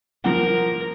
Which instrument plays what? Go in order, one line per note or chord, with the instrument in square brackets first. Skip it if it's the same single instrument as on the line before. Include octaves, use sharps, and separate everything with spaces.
[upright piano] F3 A#3 F#5 [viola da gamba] A#4